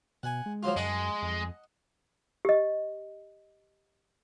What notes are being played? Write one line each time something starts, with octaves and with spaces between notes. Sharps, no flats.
B2 F#5 G#5
G#3
F3 F#3 F4
F#2 G#3 D#5 F#5 A5
F2
G4 D#5